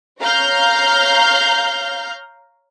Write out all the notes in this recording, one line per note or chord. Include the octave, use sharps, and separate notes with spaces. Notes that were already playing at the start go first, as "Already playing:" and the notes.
C#5 F5 A#5 F6 G6